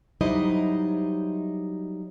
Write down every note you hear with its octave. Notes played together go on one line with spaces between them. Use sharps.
F#3 G3 D#4 E4 C5 D#5